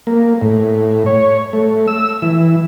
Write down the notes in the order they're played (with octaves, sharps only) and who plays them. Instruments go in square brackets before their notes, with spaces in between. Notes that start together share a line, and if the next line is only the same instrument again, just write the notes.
[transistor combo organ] A#3
A2
C#5
A3
E6
E3